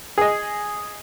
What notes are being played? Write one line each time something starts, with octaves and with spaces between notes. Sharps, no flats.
G#4 D#5